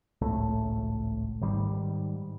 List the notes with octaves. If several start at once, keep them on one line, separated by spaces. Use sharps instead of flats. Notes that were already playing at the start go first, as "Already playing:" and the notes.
G#1 C#2 A2 A3
G#2 D#3 G3